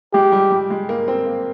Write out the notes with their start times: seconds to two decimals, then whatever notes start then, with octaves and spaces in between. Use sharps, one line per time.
0.13 G#3 G4
0.32 G3
0.51 G3
0.70 G#3
0.89 A#3
1.08 C4
1.26 A#3